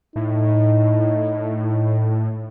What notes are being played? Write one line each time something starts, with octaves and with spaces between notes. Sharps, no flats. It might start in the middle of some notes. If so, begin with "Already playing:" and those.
A2 D#4